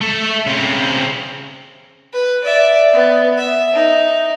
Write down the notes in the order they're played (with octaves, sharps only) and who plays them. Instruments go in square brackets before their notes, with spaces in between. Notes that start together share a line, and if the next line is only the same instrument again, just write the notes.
[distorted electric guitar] A3 A4
C#3 C4
[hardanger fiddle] B4
D5 E5
B3
E5
D#4